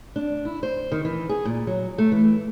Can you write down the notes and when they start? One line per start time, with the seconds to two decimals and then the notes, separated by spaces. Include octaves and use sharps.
0.16 D4
0.45 E4
0.63 C5
0.92 D#3
1.05 E3
1.29 G#4
1.45 A#2
1.67 F#3
1.98 A3
2.12 E3